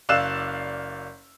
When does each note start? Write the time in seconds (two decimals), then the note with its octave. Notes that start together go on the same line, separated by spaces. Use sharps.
0.09 F#1 D5 F5 E6 F#6 E7